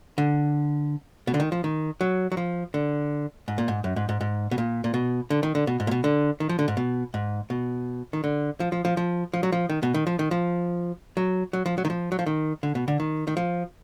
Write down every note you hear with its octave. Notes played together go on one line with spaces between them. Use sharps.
D3
B2
D3
D#3
F3
D#3
F#3
F#3
F3
D3
G#2
A#2
G#2
F#2
G#2
G#2
G#2
B2
A#2
A#2
B2
D3
D#3
D3
B2
G#2
A#2
B2
D3
D#3
F3
D3
G#2
B2
G#2
B2
D#3
D3
F3
F3
F3
F3
F3
F#3
F3
D#3
B2
D#3
F3
D#3
F3
F#3
F#3
F3
F#3
D#3
F3
F#3
F3
D#3
D3
B2
D3
D#3
D#3
F3